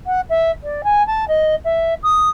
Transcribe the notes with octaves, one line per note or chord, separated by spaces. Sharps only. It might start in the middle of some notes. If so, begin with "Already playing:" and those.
F#5
E5
D5
G#5
A5
D#5
E5
D#6